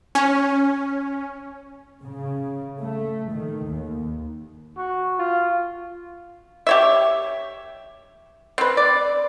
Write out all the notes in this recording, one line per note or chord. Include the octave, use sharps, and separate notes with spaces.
C#4
C#3
A3
D#3
D#2
F#4
F4
G4 C#5 E5
C4 B4
D5